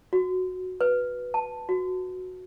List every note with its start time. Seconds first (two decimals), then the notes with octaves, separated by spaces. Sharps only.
0.13 F#4
0.81 B4
1.34 A5
1.69 F#4